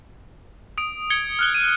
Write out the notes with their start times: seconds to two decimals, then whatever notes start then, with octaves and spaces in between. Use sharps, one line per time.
0.78 D#6 D7
1.10 G#6 C#7 G7
1.39 F6 F#6 G7
1.54 D#7